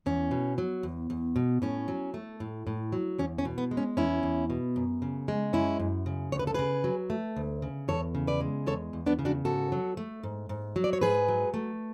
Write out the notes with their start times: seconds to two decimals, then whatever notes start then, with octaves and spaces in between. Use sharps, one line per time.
0.06 E2 C#4
0.31 B2
0.58 F#3
0.83 E2
1.10 E2
1.36 B2
1.62 A2 C#4
1.88 F#3
2.14 A3
2.40 A2
2.67 A2
2.92 F#3
3.19 E2 C#4
3.38 C#4
3.45 B2
3.58 B3
3.71 G#3
3.77 C#4
3.97 E2 C#4 E4
4.23 E2
4.50 B2
4.76 F#2
5.02 C#3
5.28 G#3
5.53 F#2 C#4 E4
5.79 F#2
6.06 C#3
6.32 D2 C#5
6.39 B4
6.47 A4
6.54 C#3 G#4 B4
6.84 F#3
7.10 A3
7.36 D2
7.62 C#3
7.88 E2 A4 C#5
8.15 C#3
8.27 B4 D5
8.41 G#3
8.66 E2 A4 C#5
8.93 E2
9.06 B3 D4
9.19 C#3
9.25 D4 F#4
9.45 G#2 F#4 A4
9.72 F#3
9.97 A3
10.23 G#2
10.49 G#2
10.76 F#3
10.84 D5
10.93 C#5
11.01 G#2 G#4 B4
11.28 F#3
11.54 A3